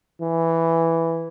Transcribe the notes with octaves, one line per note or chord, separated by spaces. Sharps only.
E3